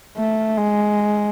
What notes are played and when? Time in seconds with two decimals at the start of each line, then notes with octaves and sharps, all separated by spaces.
0.17 A3
0.58 G#3